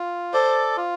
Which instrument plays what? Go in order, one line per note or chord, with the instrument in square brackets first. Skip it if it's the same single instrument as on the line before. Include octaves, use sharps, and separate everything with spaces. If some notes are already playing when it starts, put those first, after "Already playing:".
Already playing: [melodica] F4
[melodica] A4 D5 [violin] C5
[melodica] F4